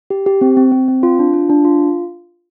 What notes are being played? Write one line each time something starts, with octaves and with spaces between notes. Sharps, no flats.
G4
G4
C4
C4
C4
C4
F4
D4
F4
D4
F4